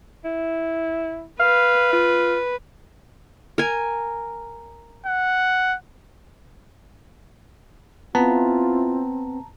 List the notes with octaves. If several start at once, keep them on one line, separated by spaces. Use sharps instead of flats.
E4
B4 F5
F4
A#4 G#5
F#5
B3 C4 E4 F4 A5 A#5